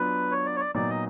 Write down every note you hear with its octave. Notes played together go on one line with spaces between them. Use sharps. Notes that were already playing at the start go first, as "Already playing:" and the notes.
Already playing: F#3 B3 D4 F4 B4
C#5
D5
C#5
D5
A#2 F#3 B3 D#4 D5
D#5